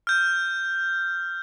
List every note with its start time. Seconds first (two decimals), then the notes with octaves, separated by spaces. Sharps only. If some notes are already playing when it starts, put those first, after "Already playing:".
0.07 F6 G6